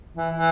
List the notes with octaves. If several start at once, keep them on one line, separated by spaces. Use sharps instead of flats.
E3
E3